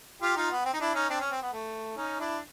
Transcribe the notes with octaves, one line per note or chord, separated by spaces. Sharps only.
F4 G4
D#4 F4
B3
C4
D#4
D4 E4
C#4 D#4
C4 D4
C#4
C4
B3
A3
C#4 D#4
D4 E4